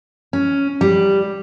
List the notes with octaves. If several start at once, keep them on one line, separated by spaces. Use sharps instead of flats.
C#4
G3